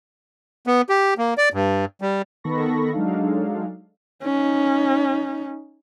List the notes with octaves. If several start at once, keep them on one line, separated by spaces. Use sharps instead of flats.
B3
G4
A#3
D5
G2
G3
D#3 B3 A4 B5 C#6 A#6
F#3 G#3 D4 D#4 A4 F5
C#4 D#4